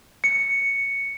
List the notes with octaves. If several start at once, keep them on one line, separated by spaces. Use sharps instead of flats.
C#7